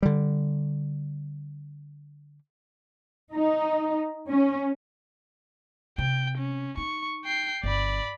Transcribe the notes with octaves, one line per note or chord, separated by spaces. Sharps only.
D3 G3
D#4
C#4
C3 G5
C#4
D#4 C#6
G5 C7
G1 D5 B5